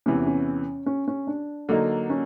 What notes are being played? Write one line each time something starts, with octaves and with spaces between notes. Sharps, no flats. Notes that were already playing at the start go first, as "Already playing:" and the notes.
E2 C3 E3 C#4
C#4
C#4
C#4
D4
D3 F#3 A#3 D#4
C#4